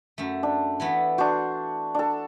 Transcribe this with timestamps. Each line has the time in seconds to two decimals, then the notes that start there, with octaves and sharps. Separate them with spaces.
0.18 F#2 A3
0.43 D4
0.80 E3 A3 B3
1.18 D4 F#4 C5
1.94 D4 A4